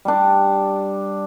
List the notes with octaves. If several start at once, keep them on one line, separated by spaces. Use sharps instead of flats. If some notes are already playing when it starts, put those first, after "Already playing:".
G3 D4